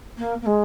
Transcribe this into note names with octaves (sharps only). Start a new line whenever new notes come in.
A#3
A#3
G#3